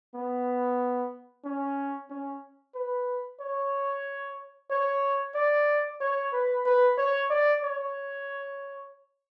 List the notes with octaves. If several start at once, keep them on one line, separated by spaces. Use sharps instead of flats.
B3
C#4
C#4
B4
C#5
C#5
D5
C#5
B4
B4
C#5
D5
C#5